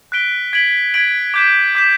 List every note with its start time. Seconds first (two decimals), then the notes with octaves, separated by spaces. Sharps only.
0.12 F#6 B6 D7 G7
0.53 G#6 B6 D7 F#7
0.94 G#6 B6 D7 F#7
1.34 D6 G6 B6 E7
1.75 D6 G6 B6 E7